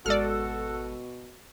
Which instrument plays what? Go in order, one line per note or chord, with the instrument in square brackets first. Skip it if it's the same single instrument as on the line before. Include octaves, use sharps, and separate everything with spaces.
[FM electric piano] G#1 G#3 E6 [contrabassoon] B2 [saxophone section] F#4 A4 [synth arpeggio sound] D5 F6